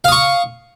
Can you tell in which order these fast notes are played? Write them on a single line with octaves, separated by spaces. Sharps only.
F5 D#6 C#6